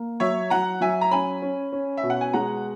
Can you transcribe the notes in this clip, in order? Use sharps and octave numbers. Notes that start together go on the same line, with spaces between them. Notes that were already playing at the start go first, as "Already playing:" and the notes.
Already playing: A#3
F#3 C#5 E5
F#3 F#5 A#5
F#3 E5 G#5
A#5
C#4 G#5 B5
C#4
C#4
E5
B2
F#5
G#5
G#3 F#5 A#5